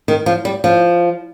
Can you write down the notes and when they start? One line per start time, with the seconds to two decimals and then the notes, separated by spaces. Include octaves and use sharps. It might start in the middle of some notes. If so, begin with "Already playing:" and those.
0.08 D#3
0.26 F3
0.45 G3
0.64 F3